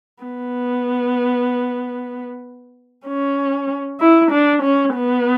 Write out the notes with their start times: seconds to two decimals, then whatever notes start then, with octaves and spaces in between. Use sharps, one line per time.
0.24 B3
3.06 C#4
4.00 E4
4.31 D4
4.63 C#4
4.95 B3